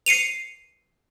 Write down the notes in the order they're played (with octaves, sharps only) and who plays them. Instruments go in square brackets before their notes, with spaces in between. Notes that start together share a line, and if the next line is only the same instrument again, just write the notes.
[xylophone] C7 C#7 D#7 F7